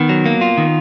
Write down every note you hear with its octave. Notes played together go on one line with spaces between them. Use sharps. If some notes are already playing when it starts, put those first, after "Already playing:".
Already playing: D#3 B3
F#3
A#3
F4
D#3